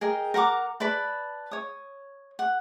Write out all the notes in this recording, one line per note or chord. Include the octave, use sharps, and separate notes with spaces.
G#4 A#4 D#5 G5
A#4 F#5 A#5 D6
B4 D5 A5 B5
C#5 D#6
F#5